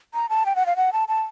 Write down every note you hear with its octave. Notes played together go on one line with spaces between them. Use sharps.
A#5
A5
G5
F#5
F5
F#5
A5
A5